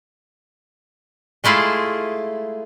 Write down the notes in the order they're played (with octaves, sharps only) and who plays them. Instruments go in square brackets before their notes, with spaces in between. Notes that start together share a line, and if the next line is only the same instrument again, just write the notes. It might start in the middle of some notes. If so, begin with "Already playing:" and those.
[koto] G#3 A3 E4 F4 G#4